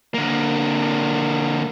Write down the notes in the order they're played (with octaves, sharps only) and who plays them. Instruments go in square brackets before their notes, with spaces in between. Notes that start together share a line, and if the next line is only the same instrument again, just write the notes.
[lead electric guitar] D3 A#3